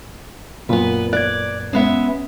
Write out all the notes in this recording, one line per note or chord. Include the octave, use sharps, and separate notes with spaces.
F#2 A#2 B3 B4
D5 F#6 G#6
G#3 B3 C#4 E5